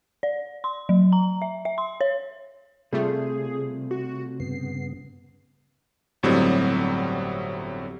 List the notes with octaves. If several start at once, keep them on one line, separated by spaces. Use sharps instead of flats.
D5
C6
F#3
A#5
E5
E5
C6
C#5
C3 G3 A3 F4 G#4
F#4
G2 C#3 B3 C7
G1 A2 F#3 G3 C4